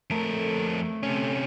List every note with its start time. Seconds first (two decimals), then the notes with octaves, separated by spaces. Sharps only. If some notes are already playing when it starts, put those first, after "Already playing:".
0.10 F2 A3 A#4
1.03 C3 C#4